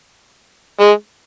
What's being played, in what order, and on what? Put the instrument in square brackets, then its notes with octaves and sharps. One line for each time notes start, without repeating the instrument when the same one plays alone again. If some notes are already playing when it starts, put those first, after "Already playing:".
[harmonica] G#3